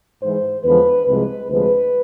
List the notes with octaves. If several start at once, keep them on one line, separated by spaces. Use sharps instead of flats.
G#2 E3 G#3 C5
E2 D3 F3 G#3 B4
C2 C3 F3 G#3 B4
D2 C3 F3 G#3 B4